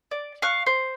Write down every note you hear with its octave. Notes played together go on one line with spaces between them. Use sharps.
D5
F5 C#6 F#6
C5